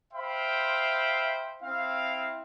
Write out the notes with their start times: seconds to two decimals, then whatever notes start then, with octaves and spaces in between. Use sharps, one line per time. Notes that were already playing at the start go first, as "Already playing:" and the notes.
0.13 C5 E5 F5 G5 B5
1.63 C4 E4 F5